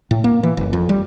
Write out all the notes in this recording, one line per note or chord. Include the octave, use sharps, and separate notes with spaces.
A2
A#3
E3
F#1
F2
G3